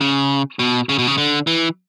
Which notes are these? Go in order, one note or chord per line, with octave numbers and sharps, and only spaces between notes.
C#3
B2
C#3
B2
C#3
D3
E3